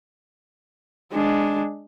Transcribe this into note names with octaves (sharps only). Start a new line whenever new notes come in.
G#3 D4